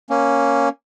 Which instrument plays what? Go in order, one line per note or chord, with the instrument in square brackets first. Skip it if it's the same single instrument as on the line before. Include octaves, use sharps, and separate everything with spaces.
[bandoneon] A#3 C#4